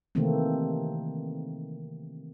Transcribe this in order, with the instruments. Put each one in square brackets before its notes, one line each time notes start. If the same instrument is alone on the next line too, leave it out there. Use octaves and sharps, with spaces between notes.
[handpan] C3 D#3 E3 A3 A#3 C4